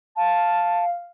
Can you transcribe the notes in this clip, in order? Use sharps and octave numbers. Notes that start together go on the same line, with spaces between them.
F5 A5